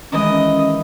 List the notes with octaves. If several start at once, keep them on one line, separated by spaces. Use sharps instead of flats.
D#3 E3 G#3 C#4 D#5